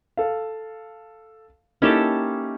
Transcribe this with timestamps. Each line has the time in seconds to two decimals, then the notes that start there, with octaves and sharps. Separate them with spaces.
0.17 A4 F5
1.82 A#3 C#4 D#4 E4 G4 A4